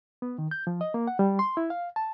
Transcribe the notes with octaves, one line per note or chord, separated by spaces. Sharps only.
B3
D#3
G6
F3
D#5
A#3
F#5
G3
C6
E4
F5
A5